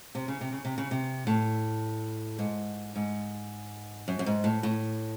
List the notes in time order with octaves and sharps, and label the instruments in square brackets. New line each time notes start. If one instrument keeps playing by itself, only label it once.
[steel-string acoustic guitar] C3
C#3
C3
C#3
C3
C#3
C3
A2
G#2
G#2
F#2
F#2
G#2
A2
A2